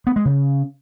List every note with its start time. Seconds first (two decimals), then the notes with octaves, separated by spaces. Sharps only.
0.07 B3
0.16 G#3
0.25 C#3